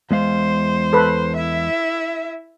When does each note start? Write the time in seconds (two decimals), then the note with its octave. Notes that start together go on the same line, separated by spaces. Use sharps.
0.11 E2 G#3 C5 F5
0.93 A4 B4
1.37 E4 E5